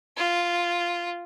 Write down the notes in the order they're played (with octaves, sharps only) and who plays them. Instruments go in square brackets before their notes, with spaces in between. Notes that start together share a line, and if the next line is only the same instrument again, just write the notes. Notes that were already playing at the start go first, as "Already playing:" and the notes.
[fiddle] F4